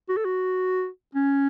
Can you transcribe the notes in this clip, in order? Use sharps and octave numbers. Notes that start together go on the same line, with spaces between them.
F#4
A4
F#4
C#4